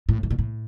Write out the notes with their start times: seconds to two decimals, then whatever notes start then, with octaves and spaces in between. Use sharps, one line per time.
0.09 A2
0.23 A2
0.30 A#2
0.39 A2